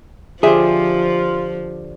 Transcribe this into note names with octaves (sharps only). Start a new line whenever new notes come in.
D3 F3 F4 G4 G#4 C5 E5